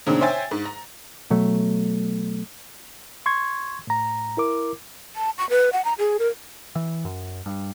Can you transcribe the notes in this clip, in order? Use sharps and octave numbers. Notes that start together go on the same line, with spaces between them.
E2 A#2 C#3 C4 D4 D#4
C5 C#5 E5 G5 G#5 A6
G#2
A#5
B2 F#3 A3
C6 C#6 G#6
A2 A#5
E4 A#4 D6
A5
C#6
B4
F#5
A#5
G#4
A#4
E3
F#2
G2